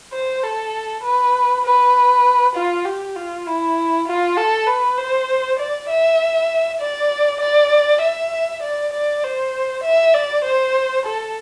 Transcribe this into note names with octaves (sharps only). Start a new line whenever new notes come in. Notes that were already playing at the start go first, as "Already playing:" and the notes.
C5
A4
B4
B4
F4
G4
F4
E4
F4
A4
B4
C5
D5
E5
D5
D5
E5
D5
D5
C5
E5
D5
C5
A4